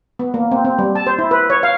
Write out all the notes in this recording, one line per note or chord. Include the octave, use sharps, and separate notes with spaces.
B3
A#3
C4
C4
G3
A5
C5
E4
B4
C#5
F5